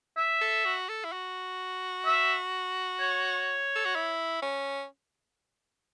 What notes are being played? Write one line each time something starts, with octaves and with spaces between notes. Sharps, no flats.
E5
A4
F#4
A4
E4
F#4
E5
C#5
A4
F#4
E4
C#4